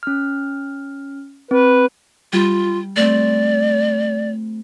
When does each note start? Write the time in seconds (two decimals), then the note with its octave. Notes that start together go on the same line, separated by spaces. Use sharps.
0.03 C#4 F6
1.51 C4 B4
2.33 G3 F4
2.96 A3 C4 D5